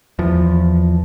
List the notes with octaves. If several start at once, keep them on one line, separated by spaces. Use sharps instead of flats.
E2 F3